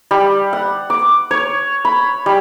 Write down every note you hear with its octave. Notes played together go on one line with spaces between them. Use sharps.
G3
F#5
D6
C#5
B5
G3